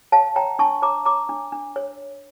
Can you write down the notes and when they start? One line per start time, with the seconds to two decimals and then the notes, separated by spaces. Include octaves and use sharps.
0.12 C#5 F5 A5
0.36 C#5 G5 A#5
0.59 D4 A5 C#6
0.82 C#5 A#5 D6
1.05 C#5 A#5 D6
1.29 D4
1.52 D4
1.76 C#5